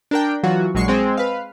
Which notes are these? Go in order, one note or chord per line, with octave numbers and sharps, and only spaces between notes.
D4 A#4 G5
E3 F#3 F4 F#4
A#1 F#3 G#3 C#6 C7
G#3 C4
B4 F5